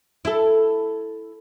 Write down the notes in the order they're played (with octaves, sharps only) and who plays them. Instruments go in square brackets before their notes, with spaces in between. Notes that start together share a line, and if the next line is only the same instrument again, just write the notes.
[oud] E4 A4